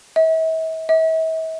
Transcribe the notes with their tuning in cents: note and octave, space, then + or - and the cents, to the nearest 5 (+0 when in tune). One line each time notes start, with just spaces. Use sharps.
E5 -40
E5 -40